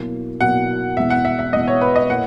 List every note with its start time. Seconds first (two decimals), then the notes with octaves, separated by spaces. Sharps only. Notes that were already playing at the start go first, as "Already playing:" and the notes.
Already playing: B2 F#3 A#3 E4
0.40 B2 F#3 A#3 E4 F#5
0.97 E2 B2 G#3 E5
1.10 F#5
1.25 E5
1.39 E5
1.53 E2 B2 G#3 D#5
1.68 C#5
1.81 B4
1.96 D#5
2.10 A#2 A#3 E4 F#5